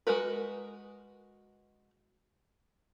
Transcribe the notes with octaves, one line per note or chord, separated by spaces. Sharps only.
G#3 F#4 A#4 B4